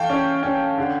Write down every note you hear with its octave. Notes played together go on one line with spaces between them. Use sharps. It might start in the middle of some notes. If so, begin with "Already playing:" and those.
Already playing: E3 A3 F5 G5 A5
C#4
C#4
D3